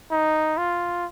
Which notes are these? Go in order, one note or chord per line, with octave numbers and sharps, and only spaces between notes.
D#4
F4